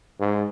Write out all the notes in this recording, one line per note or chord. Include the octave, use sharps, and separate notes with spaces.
G#2